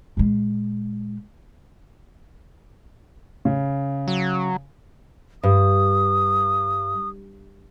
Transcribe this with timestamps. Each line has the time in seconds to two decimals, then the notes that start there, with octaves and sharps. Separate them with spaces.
0.17 A#2 G#3
3.45 C#3
4.07 F#3
5.43 G2 D#6